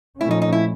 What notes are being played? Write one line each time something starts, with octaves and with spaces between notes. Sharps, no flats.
A#2 F3 A3 C#4 E4
D#4
D#4
E4